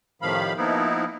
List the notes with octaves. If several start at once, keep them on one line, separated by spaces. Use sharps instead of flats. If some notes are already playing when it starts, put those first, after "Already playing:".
A2 C3 D#3 F3 F5 B5
F3 A#3 B3 D#4 E4